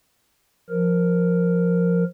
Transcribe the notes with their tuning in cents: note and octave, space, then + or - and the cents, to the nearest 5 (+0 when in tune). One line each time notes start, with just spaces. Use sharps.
F3 +0 A#4 +0